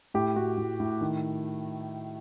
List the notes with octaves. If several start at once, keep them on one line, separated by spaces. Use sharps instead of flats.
A2 G4
A2 F#4
A2
A2
D#3